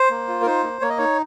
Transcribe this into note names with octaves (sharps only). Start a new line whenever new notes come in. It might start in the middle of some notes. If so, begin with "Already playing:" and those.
Already playing: C5
A#3
F4
A#4
D#4 C5
A#3
A#3 C#5
D#5
D#4 C#5